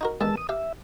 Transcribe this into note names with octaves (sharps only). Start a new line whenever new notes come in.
D#4 F#4 A#4
E2 G2 D#3 G#3 A5 E6
D#6
G4 E5 F5